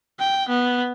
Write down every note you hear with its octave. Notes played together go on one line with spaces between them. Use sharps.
G5
B3